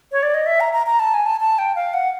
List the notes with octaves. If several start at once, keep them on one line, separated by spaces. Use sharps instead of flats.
C#5
D5
D#5
E5
A#5
A#5
A#5
A5
G#5
A5
A5
G5
F5
F#5